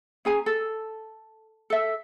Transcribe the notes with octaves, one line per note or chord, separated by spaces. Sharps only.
C#4 G#4 G#5 A#5
A4
A4 E5